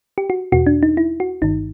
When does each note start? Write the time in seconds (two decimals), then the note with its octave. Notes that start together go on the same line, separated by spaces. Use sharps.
0.18 G4
0.30 F#4
0.52 E2 B2 F#4
0.67 D4
0.83 D#4
0.97 E4
1.20 F#4
1.42 G1 G2 D#3 D#4